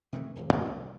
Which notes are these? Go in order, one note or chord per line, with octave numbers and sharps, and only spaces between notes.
C3 D#3 E3 A3
D1 G#1 F2
D#2
C2